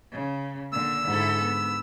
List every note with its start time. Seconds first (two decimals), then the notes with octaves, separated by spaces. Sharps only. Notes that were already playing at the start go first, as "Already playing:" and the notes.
0.12 C#3
0.73 A#2 D3 E6
1.07 G#2 D3 E4 A4
1.42 B3